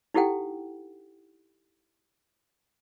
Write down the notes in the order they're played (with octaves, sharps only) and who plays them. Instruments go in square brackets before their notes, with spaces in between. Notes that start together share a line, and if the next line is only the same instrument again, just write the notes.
[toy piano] D#4 E4 G4 A4 F#5 G5